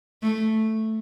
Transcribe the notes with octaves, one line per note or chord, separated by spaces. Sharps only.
A3